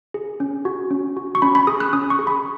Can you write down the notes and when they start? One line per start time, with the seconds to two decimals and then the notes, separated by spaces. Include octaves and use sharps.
0.14 G#4
0.40 C#4
0.65 F#4
0.91 C#4
1.17 F#4
1.35 C#6
1.42 C#4 B5
1.55 B5
1.67 G#4 D#6
1.80 F#6
1.93 C#4 D#6
2.10 C#6
2.19 G#4
2.27 B5